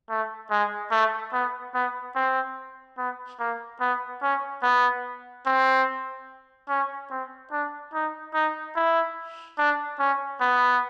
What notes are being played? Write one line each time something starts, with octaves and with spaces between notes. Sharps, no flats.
A3
G#3
A3
B3
B3
C4
B3
A#3
B3
C#4
B3
C4
C#4
C4
D4
D#4
D#4
E4
D4
C#4
B3